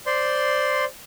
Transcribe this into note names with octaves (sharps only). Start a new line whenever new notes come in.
C5 D5 C6